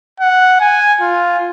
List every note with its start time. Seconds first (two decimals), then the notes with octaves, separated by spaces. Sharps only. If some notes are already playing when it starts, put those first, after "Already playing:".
0.21 F#5
0.60 G#5
1.01 F4